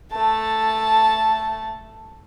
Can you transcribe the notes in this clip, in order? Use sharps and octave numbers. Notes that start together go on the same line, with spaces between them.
A3 A5